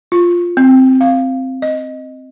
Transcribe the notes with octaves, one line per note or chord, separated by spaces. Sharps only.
F4
C4
F5
D#5